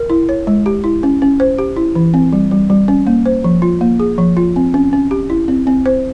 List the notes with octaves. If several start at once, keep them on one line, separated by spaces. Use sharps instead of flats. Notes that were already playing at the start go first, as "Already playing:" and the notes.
Already playing: A#4
E4
C#5
G#3
G4
E4
C#4
C#4
C5
G4
E4
E3
C4
G3
G3
G3
C#4
A#3
C5
F3
F4
A#3
G#4
F3
F4
C4
C#4
C#4
G4
E4
C4
C4
C5